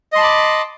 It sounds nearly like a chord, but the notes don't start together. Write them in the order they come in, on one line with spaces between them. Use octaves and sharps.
D#5 C6 A5 B5 D6